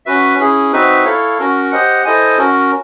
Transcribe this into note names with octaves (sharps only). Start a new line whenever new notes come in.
C#4 F#4 B4 E5
C#4 E4 G#4
C4 D#4 F#4 B4 E5
E4 A4 C#5 F5
C#4 F#4 A#4
G4 C5 D#5 F#5
E4 A4 C5 D#5 G#5
C#4 F#4 A#4